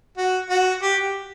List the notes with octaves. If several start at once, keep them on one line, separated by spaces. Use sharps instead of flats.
F#4
F#4
G4